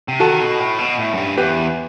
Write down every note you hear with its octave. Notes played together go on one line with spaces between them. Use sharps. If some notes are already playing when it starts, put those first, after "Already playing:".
C3
D#3 F#4 A4
B2
A2
B2
A2
F#2
G2
E2 G4 B4